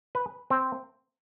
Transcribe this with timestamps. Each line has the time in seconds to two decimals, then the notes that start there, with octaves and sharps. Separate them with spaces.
0.15 B4
0.50 C4